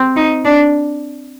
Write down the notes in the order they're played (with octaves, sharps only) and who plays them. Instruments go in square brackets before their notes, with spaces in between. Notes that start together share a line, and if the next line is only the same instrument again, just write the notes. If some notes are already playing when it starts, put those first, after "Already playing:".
Already playing: [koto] C4
[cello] D#4
D4